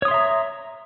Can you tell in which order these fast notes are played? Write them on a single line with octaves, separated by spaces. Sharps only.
C#5 D#6 C6 E5 A#5